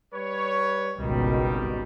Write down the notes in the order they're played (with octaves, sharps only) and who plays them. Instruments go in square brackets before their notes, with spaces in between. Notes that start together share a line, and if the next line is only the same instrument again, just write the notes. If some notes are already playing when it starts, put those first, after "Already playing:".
[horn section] G3 B4 C#5
[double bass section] G#1 B2 [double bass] C#2 [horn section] D#3 G3